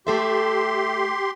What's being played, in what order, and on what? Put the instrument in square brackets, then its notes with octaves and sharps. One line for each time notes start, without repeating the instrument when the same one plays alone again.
[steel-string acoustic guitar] A3 A4 E5 [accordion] G4 C6